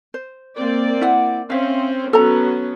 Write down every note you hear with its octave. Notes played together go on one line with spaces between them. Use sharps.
C5
A#3 C4 D5
E4 F#5
C4 C#4 C5 E5 F5
F#3 B3 C#4 A4 A#5